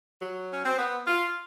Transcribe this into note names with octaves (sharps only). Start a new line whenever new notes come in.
F#3
C#4
C4
B3
F4